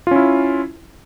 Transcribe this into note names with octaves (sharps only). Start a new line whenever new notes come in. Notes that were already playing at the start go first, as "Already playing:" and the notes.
C#4 E4 F4